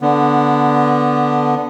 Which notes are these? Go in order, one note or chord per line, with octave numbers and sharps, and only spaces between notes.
D3 B3